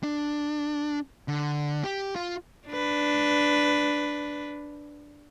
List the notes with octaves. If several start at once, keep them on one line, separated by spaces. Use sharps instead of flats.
D4
D3
G4
F4
D4 B4